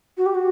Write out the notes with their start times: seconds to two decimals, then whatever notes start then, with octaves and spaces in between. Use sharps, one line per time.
0.18 F#4
0.26 G4
0.35 F#4